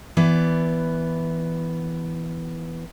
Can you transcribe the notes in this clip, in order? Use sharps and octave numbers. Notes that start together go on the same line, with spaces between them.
E3 B3 D5